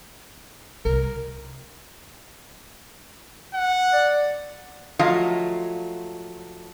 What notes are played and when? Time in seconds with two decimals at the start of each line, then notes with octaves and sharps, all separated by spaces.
0.85 C2 A#4
3.54 F#5
3.93 D5
4.99 F3 F#3 A3 F4 D#5 F5